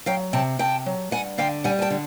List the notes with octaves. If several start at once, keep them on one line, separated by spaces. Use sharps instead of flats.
F#3 F5 G5
C3 G5 A5
C3 G5 A5
F#3
G2 F#5 G#5
D3 F5 G5
G3 F#5 G#5
G#5
G5 A5
D3